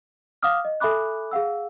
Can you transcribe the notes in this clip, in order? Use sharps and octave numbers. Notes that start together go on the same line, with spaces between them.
F5 F#5 D6 D#6 F6
D#5
A4 E5 G#5 B5 D6 F#6
G#4 F5 F#5 E6